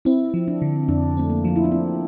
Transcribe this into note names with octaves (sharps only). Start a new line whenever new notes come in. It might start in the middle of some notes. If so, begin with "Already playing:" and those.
C4 E4
F3
D4
D3
F2 D4
A3 C4
A#3
F3 F4
E4
D4
C4 E4